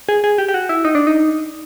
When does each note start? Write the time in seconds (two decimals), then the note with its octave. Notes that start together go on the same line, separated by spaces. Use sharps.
0.09 G#4
0.24 G#4
0.38 G4
0.48 G4
0.54 F#4
0.69 E4
0.85 D#4
0.95 D4
1.07 D#4